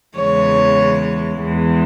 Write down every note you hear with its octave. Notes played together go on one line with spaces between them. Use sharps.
E2 C#3 E3 G#3 C#5
E2 E3 G#3